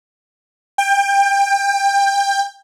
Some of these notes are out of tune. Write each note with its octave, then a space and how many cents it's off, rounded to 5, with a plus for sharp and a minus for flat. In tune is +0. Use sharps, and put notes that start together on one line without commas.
G5 +25